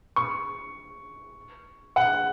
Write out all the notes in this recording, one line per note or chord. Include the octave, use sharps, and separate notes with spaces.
C#6
F#5